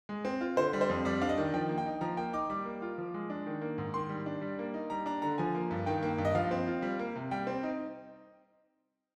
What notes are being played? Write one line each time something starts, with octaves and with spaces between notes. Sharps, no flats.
G#3
C4
F4
D3 C5
G3
C5
F2
G3 D5
D4 F5
D#5
D#3
F3 G5
A#3
G5
D#4
F3 A#5
A#3 G5
D#4 D6
G3 D6
A#3
F4
F3
G#3
D4
D#3
A#3
G#2
D#3 C6
G3
D4
G3
A#3
D#4
G3 A#5
D4 A#5
D3 A#5
F3 G#5
A#3
G2
D#3 G5
A#3
G2
D#5
F3 F5
C4
F4
G3
A#3
C3
G3 G5
C4
D#4